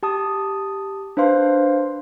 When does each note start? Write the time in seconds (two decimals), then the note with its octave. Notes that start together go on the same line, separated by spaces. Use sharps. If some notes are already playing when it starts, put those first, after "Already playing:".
0.03 G4 A5 D#6
1.17 D4 B4 C5 F5 C6